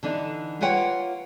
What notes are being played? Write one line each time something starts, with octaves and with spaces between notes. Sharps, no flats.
D3 E3 D4 D#4
A#3 F4 B4 C#5 F#5 G5